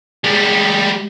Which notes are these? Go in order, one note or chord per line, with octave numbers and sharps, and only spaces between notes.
G3 G#3